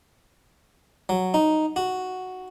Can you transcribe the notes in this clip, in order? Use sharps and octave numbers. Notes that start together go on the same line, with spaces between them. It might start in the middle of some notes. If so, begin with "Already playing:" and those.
F#3
D#4
F#4